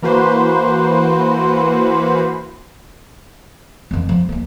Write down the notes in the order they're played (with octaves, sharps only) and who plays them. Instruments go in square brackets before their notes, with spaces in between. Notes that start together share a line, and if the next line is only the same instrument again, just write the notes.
[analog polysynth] E3 A#3 F#4 B4 C5
[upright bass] F2 E3
F3
D#3 A#3